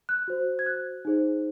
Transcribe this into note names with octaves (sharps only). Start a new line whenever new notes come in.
F#6
F#4 C5
G#6
F#6
D#4 G#4 C5